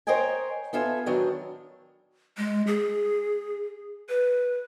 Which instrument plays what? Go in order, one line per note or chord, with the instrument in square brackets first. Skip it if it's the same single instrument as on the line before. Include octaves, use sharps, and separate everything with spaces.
[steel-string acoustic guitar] A#4 C5 C#5 D#5 G5 G#5
B3 F4 A4 E5 G#5
D#3 F#3 B3 D4
[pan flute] G#3
G#4
B4